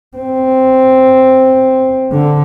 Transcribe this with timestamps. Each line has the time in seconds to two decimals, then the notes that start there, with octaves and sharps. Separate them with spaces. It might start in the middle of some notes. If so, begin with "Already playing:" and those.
0.17 C4
2.12 D3